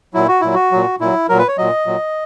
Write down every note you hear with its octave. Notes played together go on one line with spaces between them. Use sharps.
A#2 F#3 E4
F#4
A#2 F#3 E4
F#4
A#2 F#3
A#2 F#3 E4
A#2 F#3 A#4
B4
C#5
A#2 F#3 D#5
A#2 F#3